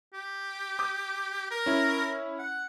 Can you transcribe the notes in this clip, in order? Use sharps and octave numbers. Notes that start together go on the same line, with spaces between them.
G4
D6 D#6 G6
A#4
C#4 E4
F#5